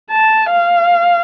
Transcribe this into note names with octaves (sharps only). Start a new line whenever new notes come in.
A5
F5